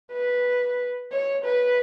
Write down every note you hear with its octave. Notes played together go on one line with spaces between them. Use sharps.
B4
C#5
B4